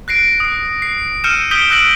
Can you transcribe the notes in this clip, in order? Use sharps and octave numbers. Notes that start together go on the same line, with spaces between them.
F#6 A#6 C7 D7
D#6 C7
C7
E6 F6 G6 C#7 D#7 E7
D#6 G6 B6 C#7 D7 G7
E6 F#6 A#6 D7 F#7